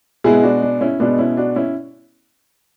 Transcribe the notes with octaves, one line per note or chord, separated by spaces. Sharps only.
B2 G#3 B3 E4 G#4
D4 F#4
D4
C#4 E4
B2 G#3 B3 D4
C#4 E4
D4 F#4
C#4 E4